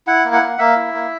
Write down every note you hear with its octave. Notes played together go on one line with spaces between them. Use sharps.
E4 F#5
A#3
F#5
A#3
A#3 E5
E4
A#3